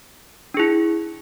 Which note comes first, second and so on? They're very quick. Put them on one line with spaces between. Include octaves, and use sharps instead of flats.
D4 G#4 E4